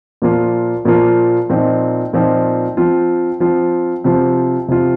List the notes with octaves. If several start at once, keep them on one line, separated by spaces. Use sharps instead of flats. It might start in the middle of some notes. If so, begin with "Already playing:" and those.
A#2 F3 A#3 F4
A#2 F3 A#3 F4
A#2 F3 C4 D#4
A#2 F3 C4 D#4
F3 C4 F4
F3 C4 F4
C3 F3 C4 F4
C3 F3 C4 F4